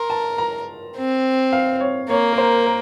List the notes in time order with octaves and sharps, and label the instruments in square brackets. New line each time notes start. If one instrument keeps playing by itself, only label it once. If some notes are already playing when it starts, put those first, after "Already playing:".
Already playing: [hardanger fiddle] A#4 [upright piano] C6
[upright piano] A5
A#5
[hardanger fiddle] C4
[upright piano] F5
C#5
[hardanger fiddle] A#3 [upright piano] C#5
[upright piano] A#4
C5
A#4